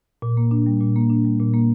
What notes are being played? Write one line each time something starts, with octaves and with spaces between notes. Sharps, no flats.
A#2
A#3
D4
G3
A#2
A#3
D4
G3
A#2
A#3